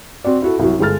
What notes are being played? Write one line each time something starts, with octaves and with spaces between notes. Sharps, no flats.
C4 F#4 D5
E4 F#4 A4
C2 F#3
G1 G#3 A4 F6 A6